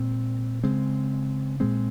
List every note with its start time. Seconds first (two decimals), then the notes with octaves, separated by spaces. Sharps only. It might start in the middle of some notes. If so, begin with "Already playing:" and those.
Already playing: A#2 G#3 C4
0.64 C#3 G#3 C4
1.60 A#2 G#3 C4